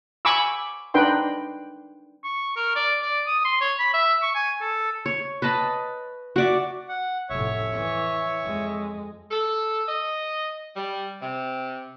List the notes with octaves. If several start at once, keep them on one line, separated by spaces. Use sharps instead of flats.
G#5 B5 C#6 D6 E6
D4 D#4 B4 G5 C6
C#6
A#4
D5
D5
D#6
C6
C#5
B5
E5
C#6
G#5
A4
C#5
B4 D#5 A5 B5
F#4 D5 E5
F#5
F1 A2 C#5 E5 C#6
E3
F2 G#3
A4
D#5
G3
C3